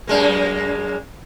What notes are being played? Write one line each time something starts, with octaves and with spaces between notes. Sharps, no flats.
F#2 G#3 A#3